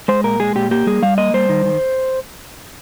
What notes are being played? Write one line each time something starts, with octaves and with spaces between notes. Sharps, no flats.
G#3 C5
A#2 A#4
G#3 G#4
A#2 G4
A#3 G4
G3 G#4
G3 F5
A#3 D#5
G3 C5
D#3
D#3